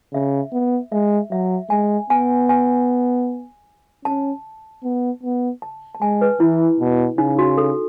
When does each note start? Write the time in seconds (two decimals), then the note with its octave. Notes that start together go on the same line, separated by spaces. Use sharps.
0.14 C#3 E5
0.53 B3
0.92 G#3 E5
1.31 F#3 E5
1.70 G#3 G#5
2.10 B3 G#5
2.49 G#5
4.05 C#4 A5
4.84 B3
5.23 B3
5.62 A5
5.95 A5
6.01 G#3 G#5
6.21 B4
6.40 E3 E4
6.80 B2
7.18 C#3 D#4
7.39 F#4
7.58 A4